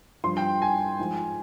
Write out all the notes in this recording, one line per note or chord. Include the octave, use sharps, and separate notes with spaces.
G2 F3 C6
G5
G#5
G#2 F3